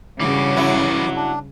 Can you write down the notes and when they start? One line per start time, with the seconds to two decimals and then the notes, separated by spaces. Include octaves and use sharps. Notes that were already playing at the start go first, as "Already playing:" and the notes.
0.20 G2 C#3 E3 F#4 D6
0.56 F#3 E4
1.16 D4